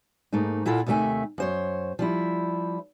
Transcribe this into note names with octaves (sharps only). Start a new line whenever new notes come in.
G#2 A3 A#3 D#4
A#2 E4 F4 A4 F#5
D#2 C3 D#3 A3 E5 G#5
F#2 C5 C#5
F3 G3 E4